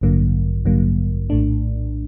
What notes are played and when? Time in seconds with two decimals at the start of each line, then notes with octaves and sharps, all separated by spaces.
0.01 A1 G2 D3 F#3 A#3
0.65 A1 G2 D3 F#3 A#3
1.30 A#1 A2 A3 D4